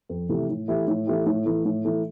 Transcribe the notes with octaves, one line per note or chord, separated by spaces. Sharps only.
F2
C3 E3 A3
A2
E3 A3 E4 G4
A2
E3 A3 E4 G4
A2
E3 A3
A2
E3 A3